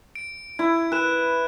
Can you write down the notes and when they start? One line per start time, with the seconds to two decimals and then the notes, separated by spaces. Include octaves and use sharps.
0.15 D7
0.59 E4 G#6
0.92 B4 F#6 E7